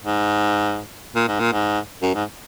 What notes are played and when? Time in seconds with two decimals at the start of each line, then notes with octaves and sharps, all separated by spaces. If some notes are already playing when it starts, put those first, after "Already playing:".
0.03 G#2
1.15 A#2
1.28 G#2
1.40 A#2
1.52 G#2
2.02 F#2
2.15 G#2